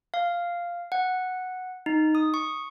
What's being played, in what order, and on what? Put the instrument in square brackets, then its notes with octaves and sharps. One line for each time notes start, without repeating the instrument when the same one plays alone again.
[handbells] F5
F#5
D#4
D#6
C#6